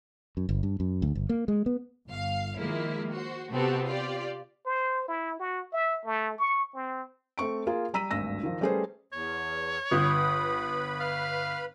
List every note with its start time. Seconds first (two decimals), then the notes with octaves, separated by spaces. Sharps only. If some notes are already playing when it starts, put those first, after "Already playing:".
0.37 F#2
0.49 G1
0.63 G2
0.80 F#2
1.02 D2
1.15 G1
1.29 A#3
1.48 G#3
1.66 B3
2.08 G1 F5
2.59 D#3 F3 G#3 A#3 E4
3.11 F#4 C5
3.52 C3 B3 C4 F#4 G4 A4
3.84 F4 G4 D5
4.66 C5
5.08 E4
5.40 F#4
5.73 E5
6.05 A3
6.38 C#6
6.74 C4
7.38 A3 C4 C#6 D7
7.67 A#3 F4 G#4
7.94 G3 A#5 E6 B6 D#7
8.11 G#1 D2 G2 E6 A#6
8.43 D#3 F3
8.61 G3 A3 C#4 G#4 B4 C5
9.13 E2 C#5
9.91 G1 B4 B5 D#6
11.00 F5